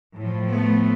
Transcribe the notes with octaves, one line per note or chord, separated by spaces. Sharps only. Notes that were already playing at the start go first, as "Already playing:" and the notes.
A2 F3
A3 B3